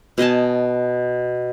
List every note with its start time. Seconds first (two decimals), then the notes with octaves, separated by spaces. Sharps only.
0.18 B2 D#5 G#5 A5